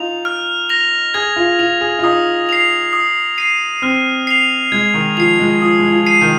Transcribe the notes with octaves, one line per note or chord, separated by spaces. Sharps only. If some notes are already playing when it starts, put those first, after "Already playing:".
Already playing: D#4 F4 F7
F6
A#6 F7
G#4 G#6
F4
F4 F7
G#4
F4
D#4 D#6
C7 F7
D#6
C7 D#7
C4 F6
C7 F7
G#3 G#6
D#3
F3 C7 F7
G#3
F3 D#6
G#3
F3
C7 D#7
D#3